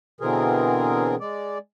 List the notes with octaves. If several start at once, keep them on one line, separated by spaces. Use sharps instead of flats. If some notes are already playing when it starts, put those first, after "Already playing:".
B2 D3 E3 C4 G#4 A#4
G#3 D5